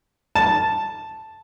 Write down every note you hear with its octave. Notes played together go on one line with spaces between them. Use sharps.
A5